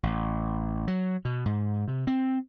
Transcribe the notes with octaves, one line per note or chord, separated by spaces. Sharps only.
A1
F#3
B2
G#2
C3
C4